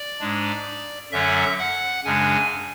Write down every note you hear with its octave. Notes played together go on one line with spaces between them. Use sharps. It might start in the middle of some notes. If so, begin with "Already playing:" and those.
Already playing: D5
G#2 G#3 D4
F#2 D3 F#3 C#4 E5
F#5
F#2 C#3 G#3 D4 G#5